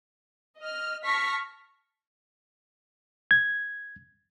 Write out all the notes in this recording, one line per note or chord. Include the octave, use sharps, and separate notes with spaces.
D#5 F6
A5 C#6 F6 A#6 B6
G#6